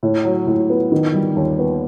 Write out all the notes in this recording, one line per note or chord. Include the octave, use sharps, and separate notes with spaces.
A2
F#3
A2
B3
D#3
G3
D#2
B3